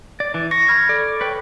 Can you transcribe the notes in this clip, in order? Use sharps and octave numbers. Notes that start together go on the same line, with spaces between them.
D5
E3
C#6 A#6
B5 F6 G#6
A4 D5
B4 C#5 G5